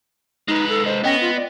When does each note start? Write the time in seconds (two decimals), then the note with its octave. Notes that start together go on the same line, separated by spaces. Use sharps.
0.48 G#3 D#4 B4
0.69 A4
0.86 C5 D#5
1.04 B3 C#4 D#5 G5 A#6
1.21 F4
1.35 D5